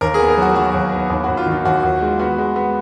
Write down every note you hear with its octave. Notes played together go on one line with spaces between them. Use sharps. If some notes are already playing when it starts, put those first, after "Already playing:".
D#2 A#4
B3 G#4
A#4
F#3 F#4
F#3 F#4
D#2
B3
D#2
D#2 F#4
F4
D#3
F4
D#2 F#4
D#2
G#3
B3 F#4
G#3
B3